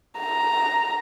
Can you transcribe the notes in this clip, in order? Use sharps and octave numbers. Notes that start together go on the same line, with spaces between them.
A#5